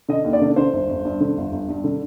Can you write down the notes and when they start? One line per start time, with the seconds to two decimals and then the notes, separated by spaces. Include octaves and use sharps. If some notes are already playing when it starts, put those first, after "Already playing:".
0.09 D3 D#5
0.24 D#2
0.33 D5
0.41 D3
0.56 D3 C5
0.73 G1
0.89 G1
1.05 G2
1.20 D3
1.37 G1
1.52 G1
1.69 G2
1.84 D3